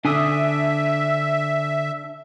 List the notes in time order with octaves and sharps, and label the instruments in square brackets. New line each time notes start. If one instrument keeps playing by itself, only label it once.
[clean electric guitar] D3 [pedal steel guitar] D4 G#5 D#6 [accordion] E5